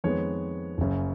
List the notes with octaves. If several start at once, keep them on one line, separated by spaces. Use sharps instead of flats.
F2 D#3 G#3 B3 C#5
F#1 F#2 C#3